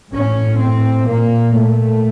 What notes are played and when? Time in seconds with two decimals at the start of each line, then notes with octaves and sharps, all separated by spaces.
0.12 A2 C#4
0.60 C4
1.08 A#2 A#3
1.56 A3